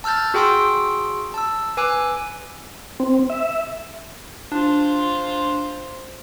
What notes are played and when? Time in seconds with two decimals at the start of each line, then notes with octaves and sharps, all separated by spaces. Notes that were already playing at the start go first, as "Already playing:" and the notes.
0.04 A5 E6 F6 G6 A6
0.34 F#4 G#4 G5 C6 D#6 E6
1.34 A5 E6
1.77 B4 G#5 D6 E6 F#6
3.00 C4
3.30 E5
4.52 D4 F4 C5